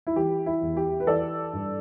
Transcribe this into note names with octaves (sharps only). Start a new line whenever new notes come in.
E4
E3 G4
E4
E2
G4
B4
E3 A4 D5
G2